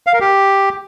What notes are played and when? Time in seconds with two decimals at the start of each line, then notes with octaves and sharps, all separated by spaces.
0.07 F5
0.13 A#4
0.20 G4